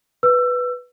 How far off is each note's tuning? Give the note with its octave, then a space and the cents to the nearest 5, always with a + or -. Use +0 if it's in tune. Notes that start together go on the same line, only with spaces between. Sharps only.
B4 +0 E6 +25